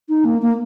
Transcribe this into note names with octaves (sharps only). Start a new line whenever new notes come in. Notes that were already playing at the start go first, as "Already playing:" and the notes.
D#4
A#3
A#3